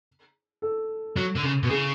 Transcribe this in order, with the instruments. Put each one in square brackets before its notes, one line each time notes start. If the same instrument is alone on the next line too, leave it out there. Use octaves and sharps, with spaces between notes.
[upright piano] A4
[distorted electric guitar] F#3
D3
C#3
B2
[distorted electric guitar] C#3 [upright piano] G#4